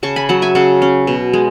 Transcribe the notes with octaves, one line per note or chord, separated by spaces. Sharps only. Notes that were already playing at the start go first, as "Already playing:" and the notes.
C#3 A5 C#6
G#5 B5
F#3 F#5 A5
E5 G#5
C#3 F#5 A5
C#4
B2
G#3